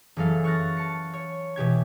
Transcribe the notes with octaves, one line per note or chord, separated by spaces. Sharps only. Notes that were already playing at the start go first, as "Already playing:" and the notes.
F#1 E3 F#3 A4 F5
C#6 F6 F#6 A6 A#6
A5 C#7
C#5
B2 E3 G4 G#6